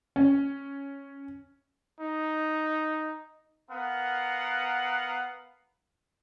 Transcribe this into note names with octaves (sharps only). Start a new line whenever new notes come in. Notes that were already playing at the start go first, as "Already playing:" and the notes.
C#4
D#4
B3 A#4 F5 F#5